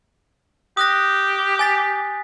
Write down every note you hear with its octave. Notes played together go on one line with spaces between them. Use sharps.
G4 D#6 F#6 A#6
G#5 A6 B6